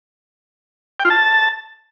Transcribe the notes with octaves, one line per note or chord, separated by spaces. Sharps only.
G5
F4
A5